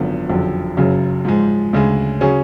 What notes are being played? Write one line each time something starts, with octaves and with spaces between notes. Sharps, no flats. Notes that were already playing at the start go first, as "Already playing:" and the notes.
Already playing: G#1 F#2 D3 F3 B3
F#1 F2 D3 F#3
F#1 F#2 C#3 F#3
G#2 F3 G#3
D2 C#3 G#3
C#3 F#3 C#4 G#4